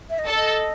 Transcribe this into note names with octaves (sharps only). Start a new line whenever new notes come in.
E5
D#5
A4 D5
D#5